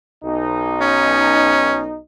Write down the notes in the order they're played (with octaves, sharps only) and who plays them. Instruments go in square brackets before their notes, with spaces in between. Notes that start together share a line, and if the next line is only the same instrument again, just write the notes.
[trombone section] B1 D#4
[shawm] C#4